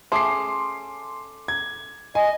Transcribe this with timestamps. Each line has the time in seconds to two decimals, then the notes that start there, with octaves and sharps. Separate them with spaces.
0.12 A3 C#4 G#4 C6 D6 C7
1.48 G#6
2.15 D#5 G#5